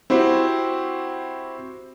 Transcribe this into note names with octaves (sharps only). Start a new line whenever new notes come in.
C4 E4 F#4 G4 C5